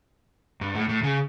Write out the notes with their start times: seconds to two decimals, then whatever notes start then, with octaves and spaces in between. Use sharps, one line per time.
0.61 G2
0.75 A2
0.89 A2
1.03 C#3